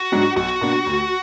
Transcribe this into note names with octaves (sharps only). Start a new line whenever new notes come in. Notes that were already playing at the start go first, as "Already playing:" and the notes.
Already playing: F#4
G#2 F#3 D4
B1 F#4
B2 A#3 D4
D2